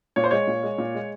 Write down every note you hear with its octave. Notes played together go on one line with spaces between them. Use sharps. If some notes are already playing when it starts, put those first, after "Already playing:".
A#2 C#5
C5
G#3 C#5
A#2
G#3
A#2
G#3